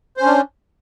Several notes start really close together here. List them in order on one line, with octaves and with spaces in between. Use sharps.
C5 C#4 D4